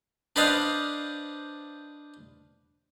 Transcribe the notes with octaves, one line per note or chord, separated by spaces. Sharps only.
D4 B4 C5 D5 D#5 F5